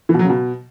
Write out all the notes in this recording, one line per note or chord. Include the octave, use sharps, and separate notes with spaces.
E3
B2
F#3
C#3
B2